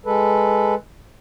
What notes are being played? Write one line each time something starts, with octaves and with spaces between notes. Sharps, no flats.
G#3 A4 B4